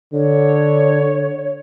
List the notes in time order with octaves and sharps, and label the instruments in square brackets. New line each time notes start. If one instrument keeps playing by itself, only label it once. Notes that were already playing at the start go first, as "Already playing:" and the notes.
[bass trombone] D3 [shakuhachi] C#5